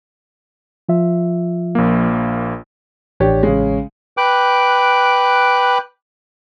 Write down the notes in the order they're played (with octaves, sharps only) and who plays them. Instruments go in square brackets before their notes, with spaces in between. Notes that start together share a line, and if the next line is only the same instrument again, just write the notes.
[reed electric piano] F3 F4 E5
[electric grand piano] A#1 A#3
[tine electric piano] A1 C#5 [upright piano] D4 G4
[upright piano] C#3 G#3
[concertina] B4 G5 D6 F#6